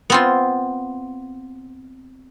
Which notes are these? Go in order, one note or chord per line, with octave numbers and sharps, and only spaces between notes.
B3 C4 F4